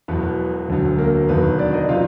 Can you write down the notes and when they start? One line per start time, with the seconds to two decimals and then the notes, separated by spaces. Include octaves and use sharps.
0.08 E1 E2 B2 F#3 B3 B4
0.68 E1 D2 D3 F#3
0.98 A#3 A#4
1.28 E1 D#2 D#3 F#3 B3 B4
1.59 D4 D5
1.74 D#4 D#5
1.88 C3 D#3 F#3 F4 F5